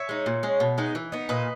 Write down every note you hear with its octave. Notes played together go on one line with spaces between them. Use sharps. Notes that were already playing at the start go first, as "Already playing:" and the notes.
Already playing: C#5 E5
G#3 D#4
A#2
G#3 C#4
B2
G#3 B3 D#4
E3
B3 D#4
A#2 B4 D#5